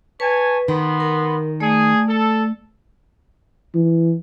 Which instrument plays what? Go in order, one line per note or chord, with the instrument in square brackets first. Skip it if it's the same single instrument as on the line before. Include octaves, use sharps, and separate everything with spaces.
[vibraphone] B4 [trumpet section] C#5 G#5 A5
[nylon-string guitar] D#3 [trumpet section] B3 B5 C6
[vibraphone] A#4
[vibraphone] A3 D5 [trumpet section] G#4
[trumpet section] A4
[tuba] E3